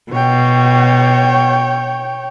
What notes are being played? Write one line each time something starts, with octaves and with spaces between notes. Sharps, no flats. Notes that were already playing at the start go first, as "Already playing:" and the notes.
B2 C#5 G5